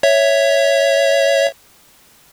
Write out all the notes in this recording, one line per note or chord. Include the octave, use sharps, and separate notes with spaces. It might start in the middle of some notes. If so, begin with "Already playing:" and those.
C#5 E5